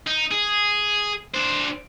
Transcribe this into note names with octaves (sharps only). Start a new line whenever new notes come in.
D#4
G#4
D4 C5